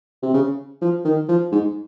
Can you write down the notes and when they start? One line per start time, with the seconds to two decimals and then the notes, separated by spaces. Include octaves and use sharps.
0.23 C3
0.34 C#3
0.82 F3
1.05 D#3
1.29 F3
1.52 G#2